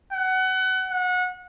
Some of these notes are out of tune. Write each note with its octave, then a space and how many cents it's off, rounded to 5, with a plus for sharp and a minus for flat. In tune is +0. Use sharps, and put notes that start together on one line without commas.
F#5 +25
F#5 -25